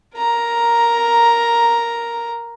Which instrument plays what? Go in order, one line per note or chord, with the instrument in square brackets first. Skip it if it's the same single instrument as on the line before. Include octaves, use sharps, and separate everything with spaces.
[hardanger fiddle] A#4 A#5